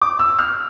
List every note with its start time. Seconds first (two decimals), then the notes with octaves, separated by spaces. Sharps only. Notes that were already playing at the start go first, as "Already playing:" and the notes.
0.01 D6
0.19 E6
0.39 F6